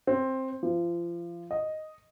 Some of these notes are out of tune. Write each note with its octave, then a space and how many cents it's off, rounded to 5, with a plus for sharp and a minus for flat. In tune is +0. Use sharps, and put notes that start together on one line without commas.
C4 +10
F3 -30
D#5 +0